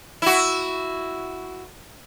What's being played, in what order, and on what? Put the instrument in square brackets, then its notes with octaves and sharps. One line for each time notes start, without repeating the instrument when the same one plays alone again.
[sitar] E4 F#4